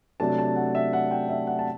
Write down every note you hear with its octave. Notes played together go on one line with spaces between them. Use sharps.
C3 F#3 A3 D4 A5
A5
F#5
E5
F#5
G5
E5
F#5
A5